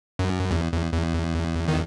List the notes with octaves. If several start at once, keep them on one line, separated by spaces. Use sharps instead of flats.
F#2
E2
E2
E2
D#3